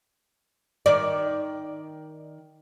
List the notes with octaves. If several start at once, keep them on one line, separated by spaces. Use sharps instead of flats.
D#3 D5